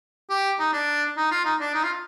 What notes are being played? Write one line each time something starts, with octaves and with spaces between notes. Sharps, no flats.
G4
D#4
D4
D#4
F4
D#4
D4
D#4
F4